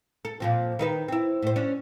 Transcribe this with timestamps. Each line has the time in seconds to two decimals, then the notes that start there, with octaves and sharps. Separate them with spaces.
0.25 A4
0.40 A#2 F3 C4
0.79 D#3 D#4 B4
1.08 C4 E4
1.43 A2 C5
1.56 C#4 D4